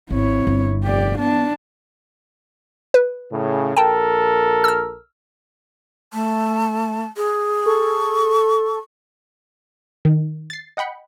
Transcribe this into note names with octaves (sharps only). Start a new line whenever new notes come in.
G#1 C4 E4 C#5
G1
F1 G4 D5
B3 D4 A5
B4
A2 C#3
A#1 A4 A#4 G5 A5
E6 F6
A3 A5
G#4
A4 C#6
D#3
A6 C7
D#5 F#5 G5 B5 C#7